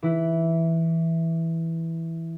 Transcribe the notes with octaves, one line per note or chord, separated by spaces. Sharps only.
E3 E4